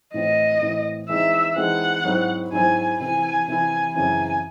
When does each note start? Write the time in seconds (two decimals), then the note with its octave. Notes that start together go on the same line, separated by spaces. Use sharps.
0.14 A2 E3 C4 D#5
0.62 A2 E3 C4
1.09 E3 G#3 C4 D#4 E5
1.56 E3 G#3 C4 D#4 F#5
2.04 G#2 F#3 C4 E4 C5
2.52 G#2 F#3 C4 E4 C5 G#5
3.00 C3 E3 C4 E4 G#5
3.47 C3 E3 C4 E4 G#5
3.95 F#2 C#3 E3 C4 G#5